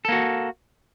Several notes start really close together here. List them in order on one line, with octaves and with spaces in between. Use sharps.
A4 A#3 F#4